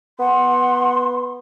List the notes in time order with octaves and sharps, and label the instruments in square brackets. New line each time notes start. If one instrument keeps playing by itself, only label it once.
[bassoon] B3 [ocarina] F#5 [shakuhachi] C6